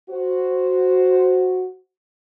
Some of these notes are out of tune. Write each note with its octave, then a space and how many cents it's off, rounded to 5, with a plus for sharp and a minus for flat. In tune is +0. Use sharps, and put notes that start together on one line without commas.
F#4 +0 C5 +0